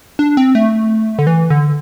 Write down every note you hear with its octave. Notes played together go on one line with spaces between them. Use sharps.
D4
C4
A3
D3
E3
D3